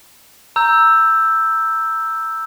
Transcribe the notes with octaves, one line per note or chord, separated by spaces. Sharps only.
A#5 E6 G6